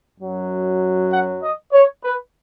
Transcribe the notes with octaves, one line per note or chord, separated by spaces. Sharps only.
F#2 F#3
F#5
D#5
C#5
B4